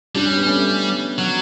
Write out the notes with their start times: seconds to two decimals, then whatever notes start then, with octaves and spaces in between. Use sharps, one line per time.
0.15 G3 D4
0.26 C#4
0.36 B3
0.47 A3 C#4
1.18 F#3